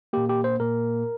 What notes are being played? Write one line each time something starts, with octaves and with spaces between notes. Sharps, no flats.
A#2 A#3 G4
G4
C5
A#2 A#3 A#4